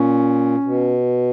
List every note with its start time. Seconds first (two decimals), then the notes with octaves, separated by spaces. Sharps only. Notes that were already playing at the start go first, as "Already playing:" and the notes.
Already playing: A#2 C#4
0.64 B2